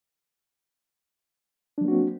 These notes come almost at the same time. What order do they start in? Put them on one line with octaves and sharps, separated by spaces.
D4 F#3 A#3 F#4 C4